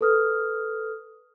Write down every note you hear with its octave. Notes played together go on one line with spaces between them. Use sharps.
A4 B4 D#6 F6